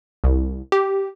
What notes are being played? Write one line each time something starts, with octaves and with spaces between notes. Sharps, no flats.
C2
G4